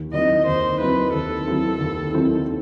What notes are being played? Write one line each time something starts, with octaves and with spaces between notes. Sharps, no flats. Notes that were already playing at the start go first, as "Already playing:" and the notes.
Already playing: D#2
D#3 F#3 C4 E4 D#5
D#2 C5
D#3 F#3 C4 E4 B4
D#2 A4
D#3 F#3 C4 E4
D#2
D#3 F#3 C4 E4